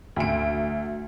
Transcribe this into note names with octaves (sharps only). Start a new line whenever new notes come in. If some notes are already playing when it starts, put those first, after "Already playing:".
D2 D7